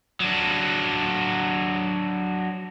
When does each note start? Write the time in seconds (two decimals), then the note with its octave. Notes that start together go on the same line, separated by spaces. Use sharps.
0.20 F#3 D4